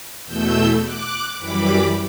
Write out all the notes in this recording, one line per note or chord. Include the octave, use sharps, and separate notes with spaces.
E2 B2 A3 E6 G6
D6 F#6
F#2 E3 G3 B5 D6